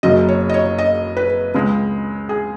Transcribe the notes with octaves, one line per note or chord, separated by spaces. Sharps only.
F#1 F#2 C#3 F#3 D#5
C#5
D#5
C#5
D#5
B4
C#2 C#3 G#3
G#4